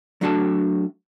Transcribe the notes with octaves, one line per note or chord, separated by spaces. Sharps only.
F#3 A3 D4 F#4 A4 A5